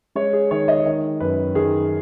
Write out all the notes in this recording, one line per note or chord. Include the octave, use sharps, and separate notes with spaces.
G#3 C#5
G#4
D#3 C#5
D#5
D#3
F#2 B4
D#3 G#4